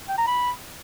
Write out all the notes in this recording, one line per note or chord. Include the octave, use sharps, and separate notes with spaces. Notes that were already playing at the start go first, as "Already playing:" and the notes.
G5
A#5
B5